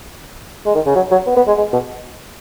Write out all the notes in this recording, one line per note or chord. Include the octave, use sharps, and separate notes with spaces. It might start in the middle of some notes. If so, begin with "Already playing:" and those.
G#3
D#3
C#3
F#3
F#3
B3
B3
G#3
G#3
B2